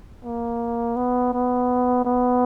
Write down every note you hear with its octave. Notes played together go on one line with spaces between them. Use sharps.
A#3
B3
B3
B3